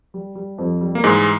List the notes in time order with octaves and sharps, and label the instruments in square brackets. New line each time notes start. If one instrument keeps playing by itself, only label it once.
[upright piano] G3
G3
F2
G3
[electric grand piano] A#3
[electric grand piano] G#2 G#3 [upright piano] E3